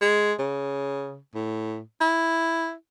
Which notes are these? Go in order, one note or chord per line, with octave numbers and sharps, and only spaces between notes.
G#3
C#3
A2
E4